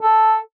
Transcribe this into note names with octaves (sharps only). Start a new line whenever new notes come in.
A4